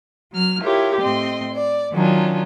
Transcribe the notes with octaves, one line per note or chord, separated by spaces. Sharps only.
F#3 F6
E4 F4 G4 A#4 C#5
A2 C4 D#5 C6
D5
D#3 F#3 C#4 D4 F4